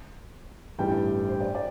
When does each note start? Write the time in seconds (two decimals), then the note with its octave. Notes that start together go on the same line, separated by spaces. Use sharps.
0.79 A1 G2 E3 G3 G5
1.29 C5
1.41 D5
1.55 D5